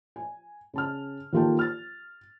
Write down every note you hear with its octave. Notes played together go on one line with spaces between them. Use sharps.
G#5
C#3 A5 F6
D#2 A#3 F4 A4 G5 A5
F6 A6